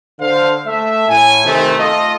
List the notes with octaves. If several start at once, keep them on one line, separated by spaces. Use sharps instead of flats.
D3 C5 F5
A3 E5
A2 G#5
C3 D#3 A3
A3 F4 A4 D#5